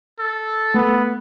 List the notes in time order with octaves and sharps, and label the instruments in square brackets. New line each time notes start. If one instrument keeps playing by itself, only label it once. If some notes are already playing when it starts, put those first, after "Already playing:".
[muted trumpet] A4
[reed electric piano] A3 [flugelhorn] B3